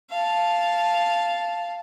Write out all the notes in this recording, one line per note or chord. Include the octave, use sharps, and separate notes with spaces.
F5 A5